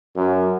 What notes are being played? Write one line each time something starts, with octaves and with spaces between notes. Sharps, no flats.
F#2